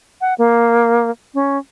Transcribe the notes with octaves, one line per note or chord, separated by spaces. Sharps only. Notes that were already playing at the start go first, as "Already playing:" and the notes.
F#5
A#3
C#4